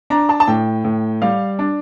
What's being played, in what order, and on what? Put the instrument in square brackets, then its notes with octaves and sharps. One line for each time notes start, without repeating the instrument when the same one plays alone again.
[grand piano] D4 A#5
A5
A5
A2 G5
A2
G3 F5
D4